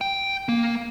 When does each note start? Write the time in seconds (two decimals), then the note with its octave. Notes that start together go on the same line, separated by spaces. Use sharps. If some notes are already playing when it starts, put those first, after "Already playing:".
0.01 G5
0.49 A#3